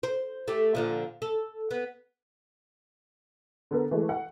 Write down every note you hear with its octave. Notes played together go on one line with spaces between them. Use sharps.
C5
A3 G4
A#2 D3 F3
A4
B3
D3 B3 A#4
E3 G#3 A3
F#5